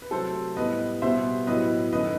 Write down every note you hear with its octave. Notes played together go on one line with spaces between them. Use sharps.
B4
C3 F#3 A3 A4 C5
A2 G3 B3 B4 D#5
B2 G3 B3 C5 E5
A2 F#3 B3 B4 D#5
F#2 D#3 A3 B4 D#5